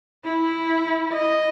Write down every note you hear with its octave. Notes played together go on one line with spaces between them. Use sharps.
E4
D#5